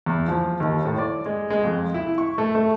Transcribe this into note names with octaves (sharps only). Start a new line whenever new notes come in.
E2
F3
D#2
A2
D5
G#3
G#3
F2
E4
C#6
A3
A3